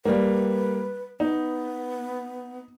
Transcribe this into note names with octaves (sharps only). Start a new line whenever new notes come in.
G3 A#3 B4
B3 D#4